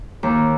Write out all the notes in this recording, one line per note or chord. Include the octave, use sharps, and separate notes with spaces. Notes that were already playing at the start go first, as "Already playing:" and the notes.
D#2